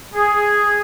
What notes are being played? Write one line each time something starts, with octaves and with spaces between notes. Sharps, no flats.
G#4